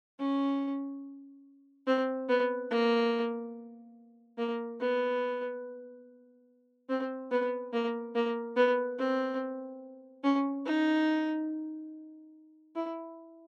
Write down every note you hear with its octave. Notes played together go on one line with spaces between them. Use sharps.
C#4
C4
B3
A#3
A#3
B3
C4
B3
A#3
A#3
B3
C4
C#4
D#4
E4